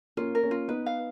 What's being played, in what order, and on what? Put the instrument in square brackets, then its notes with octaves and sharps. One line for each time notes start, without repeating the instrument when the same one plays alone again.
[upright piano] A#3 C#4 [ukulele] F4
[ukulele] A#4
[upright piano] A#3 C#4
[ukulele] F4
[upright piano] B3 D#4 [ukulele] B4
[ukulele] F5